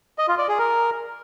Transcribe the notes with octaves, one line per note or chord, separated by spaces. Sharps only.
D#5
F4
D5
G#4
A#4